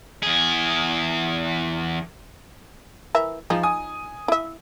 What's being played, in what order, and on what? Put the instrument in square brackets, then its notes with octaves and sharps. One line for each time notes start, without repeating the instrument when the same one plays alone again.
[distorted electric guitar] E2 G#4
[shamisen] E3 A#4 E5
[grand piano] F3 [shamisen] D#4 F4 G#4
[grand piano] G#5 D#6
[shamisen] E4 E5